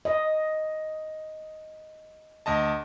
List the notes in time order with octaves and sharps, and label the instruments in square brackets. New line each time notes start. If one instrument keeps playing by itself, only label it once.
[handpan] D#5
[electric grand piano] D2 D#5 A5